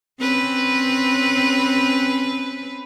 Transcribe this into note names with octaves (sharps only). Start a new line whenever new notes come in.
C4 C#4 B4